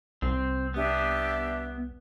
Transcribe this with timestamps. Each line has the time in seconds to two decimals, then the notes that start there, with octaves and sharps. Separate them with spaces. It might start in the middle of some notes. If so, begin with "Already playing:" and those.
0.22 C2 C4
0.74 B3 D4 G4 E5